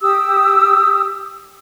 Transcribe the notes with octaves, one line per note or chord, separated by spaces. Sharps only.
G4 D#6 E6